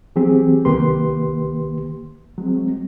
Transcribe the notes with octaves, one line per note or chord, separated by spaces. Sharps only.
E3 F#3 C4 G4 G#4
C2 D#3 A#3 G4 B4 C6
F#3 G#3 C4